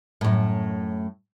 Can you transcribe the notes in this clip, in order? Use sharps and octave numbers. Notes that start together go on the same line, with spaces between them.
F#2 A2